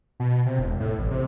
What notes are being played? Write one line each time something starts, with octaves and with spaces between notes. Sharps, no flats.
B2
C3
E1
A2
A1
C3